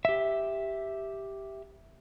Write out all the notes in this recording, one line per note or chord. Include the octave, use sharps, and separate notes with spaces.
G4 E5